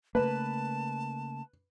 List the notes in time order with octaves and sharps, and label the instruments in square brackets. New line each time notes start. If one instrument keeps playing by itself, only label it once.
[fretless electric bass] C#3 A3 A#3 [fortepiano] B4 [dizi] A5